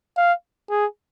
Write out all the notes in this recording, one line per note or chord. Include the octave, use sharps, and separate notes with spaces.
F5
G#4